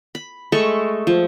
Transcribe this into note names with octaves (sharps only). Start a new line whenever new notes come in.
B5
G#3 A3 A4 C#6
F3